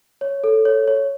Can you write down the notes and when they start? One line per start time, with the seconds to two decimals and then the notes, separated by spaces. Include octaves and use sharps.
0.21 C#5
0.44 A4
0.65 C#5
0.88 C#5